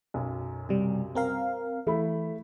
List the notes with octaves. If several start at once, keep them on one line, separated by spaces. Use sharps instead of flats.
B1 F#2
C3 G3
C4 A#4 F5
E3 A3 E4 B5